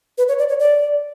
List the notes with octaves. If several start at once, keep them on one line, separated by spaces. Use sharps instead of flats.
B4
C#5
D5
C#5
D5